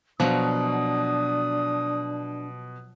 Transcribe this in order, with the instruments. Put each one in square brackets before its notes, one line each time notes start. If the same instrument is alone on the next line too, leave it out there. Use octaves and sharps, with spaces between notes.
[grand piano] B2 [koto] F3 F#3 [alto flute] D4 [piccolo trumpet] D#6